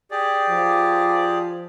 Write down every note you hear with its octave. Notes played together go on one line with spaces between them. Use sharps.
G4 G#4 D5
F3